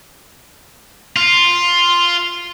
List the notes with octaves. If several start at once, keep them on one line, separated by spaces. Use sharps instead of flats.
F4